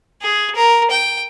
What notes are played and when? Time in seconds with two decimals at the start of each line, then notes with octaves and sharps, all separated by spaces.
0.22 G#4
0.55 A#4
0.91 G5